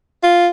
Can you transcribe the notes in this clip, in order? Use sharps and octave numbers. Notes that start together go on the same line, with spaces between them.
F4